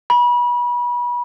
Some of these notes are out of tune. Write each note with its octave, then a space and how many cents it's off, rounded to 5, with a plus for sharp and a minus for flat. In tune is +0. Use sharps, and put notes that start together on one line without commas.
B5 -30